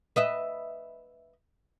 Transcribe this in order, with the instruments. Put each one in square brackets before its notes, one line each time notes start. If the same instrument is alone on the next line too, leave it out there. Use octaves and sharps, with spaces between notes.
[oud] B4 D#5 E5